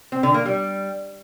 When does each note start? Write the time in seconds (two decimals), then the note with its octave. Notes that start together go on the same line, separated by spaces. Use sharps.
0.12 C4
0.23 D3
0.34 A#3
0.45 G3